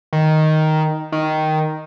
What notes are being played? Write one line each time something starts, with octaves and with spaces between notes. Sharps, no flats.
D#3
D#3